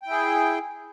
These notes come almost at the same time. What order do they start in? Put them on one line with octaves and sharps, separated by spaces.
G5 E4 G#4